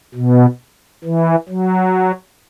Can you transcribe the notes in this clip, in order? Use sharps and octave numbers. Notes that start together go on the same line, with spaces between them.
B2
E3
F#3